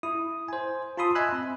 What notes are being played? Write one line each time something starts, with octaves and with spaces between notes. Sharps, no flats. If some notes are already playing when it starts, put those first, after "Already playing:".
E4 D#6
C5 G#5
F4 A5 B5 C6 D#6 E6
D#5 E5 G#5 B5 E6 F#6
C4